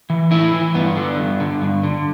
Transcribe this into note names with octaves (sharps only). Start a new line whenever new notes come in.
E3
A2 E4
E3
G2 B3
D3
G2
D3
G2
D3